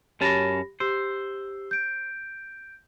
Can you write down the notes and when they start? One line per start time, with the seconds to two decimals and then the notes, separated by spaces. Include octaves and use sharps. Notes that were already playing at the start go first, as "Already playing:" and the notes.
0.21 F#2 C#4 G4 A5 B5 A#6
0.80 G4 C5 E6
1.71 G6 D7